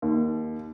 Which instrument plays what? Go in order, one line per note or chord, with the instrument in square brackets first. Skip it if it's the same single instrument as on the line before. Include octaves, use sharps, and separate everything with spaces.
[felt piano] D#2